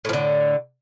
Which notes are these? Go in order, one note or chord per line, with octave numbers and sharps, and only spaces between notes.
A2 D3 F3